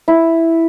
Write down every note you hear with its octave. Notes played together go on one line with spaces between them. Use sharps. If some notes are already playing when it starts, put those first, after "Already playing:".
E4